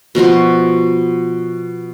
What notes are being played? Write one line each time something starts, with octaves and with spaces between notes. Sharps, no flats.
B2 F3 F#4 C6